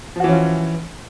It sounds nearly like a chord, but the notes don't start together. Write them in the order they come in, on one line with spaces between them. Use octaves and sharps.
F3 F#4 E3 C#4 F4